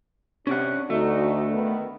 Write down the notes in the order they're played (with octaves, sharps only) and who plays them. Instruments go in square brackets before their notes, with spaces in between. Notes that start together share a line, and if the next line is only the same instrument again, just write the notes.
[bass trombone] C3 [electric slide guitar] C#4 G4 F#5 [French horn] D4
[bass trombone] D2 [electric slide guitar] A3 [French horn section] D#4 F#4
[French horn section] D#3 B3